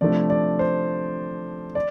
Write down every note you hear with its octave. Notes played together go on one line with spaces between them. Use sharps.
C3 F3 A3 D4 D5
D5
C5
D5